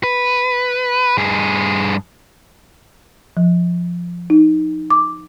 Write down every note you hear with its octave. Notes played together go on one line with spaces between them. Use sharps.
B4
G2 G#4
F3
D#4
D6